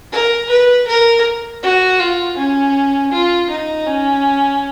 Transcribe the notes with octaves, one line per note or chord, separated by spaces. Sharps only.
A#4
B4
A#4
F#4
F4
C#4
F4
D#4
C#4